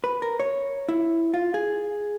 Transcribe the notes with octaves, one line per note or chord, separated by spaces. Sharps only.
B4
A#4
C#5
E4
F4
G#4